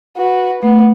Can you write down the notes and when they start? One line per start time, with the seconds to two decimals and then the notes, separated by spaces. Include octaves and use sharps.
0.17 F#4 B4
0.63 A3 B3